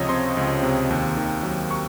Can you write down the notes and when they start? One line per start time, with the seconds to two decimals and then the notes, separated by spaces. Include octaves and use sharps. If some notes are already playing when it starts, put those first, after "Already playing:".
Already playing: C#2 C3 F3 C#5 D#5
0.09 C4 C6
0.37 C#2
0.63 C3
0.90 D#2
1.17 D#3
1.43 F#3
1.71 C#6